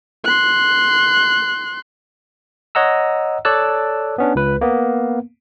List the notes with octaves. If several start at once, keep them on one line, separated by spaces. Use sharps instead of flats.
C6 F#6
C#5 D#5 F#5 A#5 E6
A4 C#5 D5 A5 E6 F#6
B3 C#4 D4
C#2 B4
A#3 B3